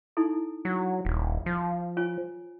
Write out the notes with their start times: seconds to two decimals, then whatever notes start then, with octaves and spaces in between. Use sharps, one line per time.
0.17 D#4 E4 A4
0.65 F#3
1.05 D#1
1.46 F3
1.97 F4 C#5 G#5